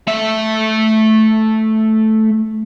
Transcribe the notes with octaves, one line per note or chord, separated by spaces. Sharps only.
A3 E5